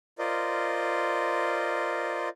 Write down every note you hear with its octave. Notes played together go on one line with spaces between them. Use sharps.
F4 A#4 C5 D5 D#5